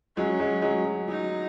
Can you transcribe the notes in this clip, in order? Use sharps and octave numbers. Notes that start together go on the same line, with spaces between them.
F#3 G#3 C#4
F#3 G#3
F#3 G#3
F#3
F#3 D#4